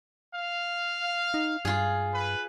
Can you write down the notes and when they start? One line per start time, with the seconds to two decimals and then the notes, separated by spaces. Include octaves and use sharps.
0.32 F5
1.34 D#4
1.65 G2 F4 G#4
2.13 B4